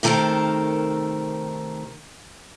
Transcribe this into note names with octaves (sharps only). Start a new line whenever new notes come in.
C3 D#3 A3 A4 A#4 C5